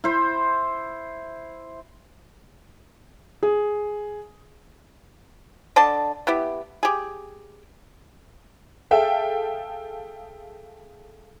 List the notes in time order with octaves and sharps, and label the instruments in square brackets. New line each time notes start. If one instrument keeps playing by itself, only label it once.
[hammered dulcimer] E4 C5
[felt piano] G#4
[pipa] D3 D5 D#5 A5
B3 E4 G4
G4 G#4
[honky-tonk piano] G#4 A4 E5 F5 G5